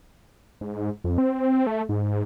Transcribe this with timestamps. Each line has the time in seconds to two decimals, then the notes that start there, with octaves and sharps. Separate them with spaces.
0.61 G#2
1.04 F2
1.18 C4
1.67 A3
1.89 G#2